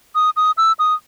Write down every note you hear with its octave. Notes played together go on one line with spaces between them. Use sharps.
D#6
D#6
E6
D#6